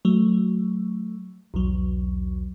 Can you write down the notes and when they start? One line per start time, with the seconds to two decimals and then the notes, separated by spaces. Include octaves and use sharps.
0.05 F#3 A3
1.54 B1 E2 F#3